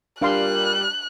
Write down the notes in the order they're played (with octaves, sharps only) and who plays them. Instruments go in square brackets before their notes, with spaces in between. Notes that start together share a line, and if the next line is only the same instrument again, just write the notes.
[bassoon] A#2 [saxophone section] G3 [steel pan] D4 F5 C6 [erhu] F#6